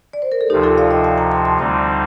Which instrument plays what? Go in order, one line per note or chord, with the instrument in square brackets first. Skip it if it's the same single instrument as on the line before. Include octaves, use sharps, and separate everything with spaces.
[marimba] D5
C5
A#4
A4
[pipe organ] D2 C3 F3 [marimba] D#4 G4
[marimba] F4 A4
D5 F5
D#5 G5
F5 A5
G5 A#5
A5 C6
A5 C6
[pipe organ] D2 D3 G3 C4 D#4